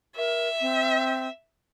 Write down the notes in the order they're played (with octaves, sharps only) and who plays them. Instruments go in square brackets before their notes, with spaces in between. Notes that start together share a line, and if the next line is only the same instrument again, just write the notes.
[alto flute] A#4 [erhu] E5
[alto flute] C4